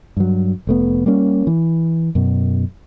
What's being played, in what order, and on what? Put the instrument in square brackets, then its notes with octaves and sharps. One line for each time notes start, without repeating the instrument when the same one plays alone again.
[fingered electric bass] G2 F#3
F1 A3 B3
G3 A#3 C#4
E3
F#2 B2